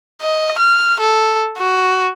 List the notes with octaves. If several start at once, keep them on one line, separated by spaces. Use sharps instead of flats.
D#5
F6
A4
F#4